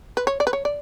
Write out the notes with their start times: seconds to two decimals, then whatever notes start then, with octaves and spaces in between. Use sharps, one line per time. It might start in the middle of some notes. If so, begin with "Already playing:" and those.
0.17 B4
0.27 C#5
0.40 D5
0.47 B4
0.53 C#5
0.65 D5